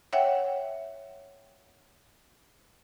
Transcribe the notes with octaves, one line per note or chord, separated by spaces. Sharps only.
C#5 E5 F#5 G5